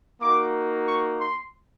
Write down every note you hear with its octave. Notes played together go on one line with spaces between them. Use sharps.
A#3 D#4 F#4 D6
C#6
C6